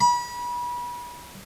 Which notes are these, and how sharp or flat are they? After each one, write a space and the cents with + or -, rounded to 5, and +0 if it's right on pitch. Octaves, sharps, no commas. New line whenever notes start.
B5 -30